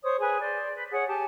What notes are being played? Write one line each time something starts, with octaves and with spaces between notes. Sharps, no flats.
C5 C#5 D#6
G#4 B4 G#5
C5 D5
B4
G#4 C#5 F#5
G4 G#5 A5